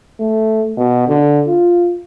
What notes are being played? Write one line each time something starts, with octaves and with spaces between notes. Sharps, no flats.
A3
B2
D3
F4